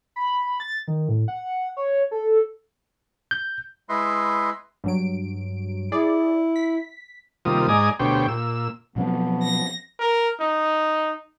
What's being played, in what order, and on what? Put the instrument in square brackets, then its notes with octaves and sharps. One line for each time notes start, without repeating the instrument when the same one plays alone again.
[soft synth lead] B5
A6
D#3
A2
F#5
C#5
A4
[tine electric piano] G6
[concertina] G#3 E4 B4 D#5 E5 C6
[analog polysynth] G2 F#3 D7
[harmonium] E4 [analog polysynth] G#4 D5
[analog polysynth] B6
[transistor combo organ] D#2 C3 G3 A#3 F4 D#6
G#2 D5 D#5 G#5 A#5 D#6
D2 B2 G4 C5 C#5 G5
A#2 E6
[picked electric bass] B2 F#3 C4 [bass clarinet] F3 [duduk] B3
[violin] A#6
[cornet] A#4
D#4